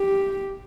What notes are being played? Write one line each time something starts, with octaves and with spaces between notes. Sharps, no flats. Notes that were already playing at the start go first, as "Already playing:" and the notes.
Already playing: G4